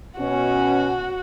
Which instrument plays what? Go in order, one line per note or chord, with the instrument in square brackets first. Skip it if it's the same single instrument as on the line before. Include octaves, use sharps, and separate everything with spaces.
[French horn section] B2 C#4 [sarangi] F#4